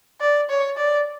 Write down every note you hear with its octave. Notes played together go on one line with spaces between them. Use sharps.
D5
C#5
D5